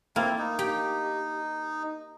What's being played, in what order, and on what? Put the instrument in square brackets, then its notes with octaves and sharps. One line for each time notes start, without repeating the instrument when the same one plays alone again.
[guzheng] A#3 [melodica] C4 E4 F4
[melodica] D#4
[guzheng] G4